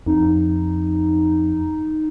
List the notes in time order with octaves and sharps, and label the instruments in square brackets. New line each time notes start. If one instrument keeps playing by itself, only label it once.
[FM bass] F2 [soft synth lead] D#4